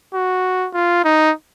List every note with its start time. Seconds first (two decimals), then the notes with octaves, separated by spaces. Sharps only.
0.14 F#4
0.74 F4
1.05 D#4